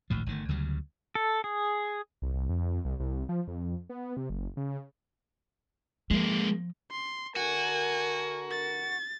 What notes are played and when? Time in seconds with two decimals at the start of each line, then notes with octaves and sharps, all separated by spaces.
0.10 G#1 D2 A2 F3
0.26 G1 D#3 A3
0.49 D2 C#3 F#3 G3
1.15 A4
1.44 G#4
2.22 C2
2.33 C2
2.49 F2
2.85 C2
3.00 C2
3.29 F3
3.48 F2
3.90 B3
4.17 C3
4.30 F#1
4.57 C#3
6.11 F3 G#3 A#3
6.91 C6
7.36 D3 F#4 A#4 G#5
8.51 A6